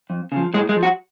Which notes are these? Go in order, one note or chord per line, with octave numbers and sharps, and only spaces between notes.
F2
C#3 F3
A2 G#3
G#3
F3
F#4